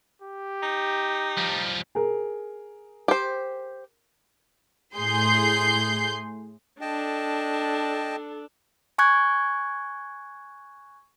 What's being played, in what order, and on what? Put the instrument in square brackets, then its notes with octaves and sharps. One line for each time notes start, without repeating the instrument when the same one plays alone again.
[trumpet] G4
[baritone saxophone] D#4
[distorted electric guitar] F3 G3
[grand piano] G#4 A#4
[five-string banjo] G4 C5
[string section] A2 G#4 C6 G6 C7
[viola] D4 A4 [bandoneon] D#5 G5 A5
[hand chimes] G#5 C#6 F#6 G#6